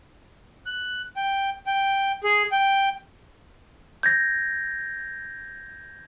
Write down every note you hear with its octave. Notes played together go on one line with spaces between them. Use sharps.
F#6
G5
G5
G#4
G5
G6 G#6 A#6